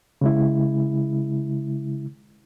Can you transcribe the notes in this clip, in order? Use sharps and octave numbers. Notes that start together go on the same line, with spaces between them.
C#3 G#3 E4